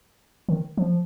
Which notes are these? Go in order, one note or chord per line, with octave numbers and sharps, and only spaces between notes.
D#3
F3